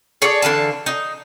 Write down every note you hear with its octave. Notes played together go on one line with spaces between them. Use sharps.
G#4 A4 C#5 D5
D3 E3 F5 A5
D#4